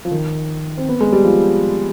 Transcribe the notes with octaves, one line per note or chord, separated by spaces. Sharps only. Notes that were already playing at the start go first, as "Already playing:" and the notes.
F3
D#3
C4
B3
G#3
G3
F3